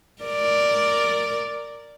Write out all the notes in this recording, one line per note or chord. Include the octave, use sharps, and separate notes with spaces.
A#4 D5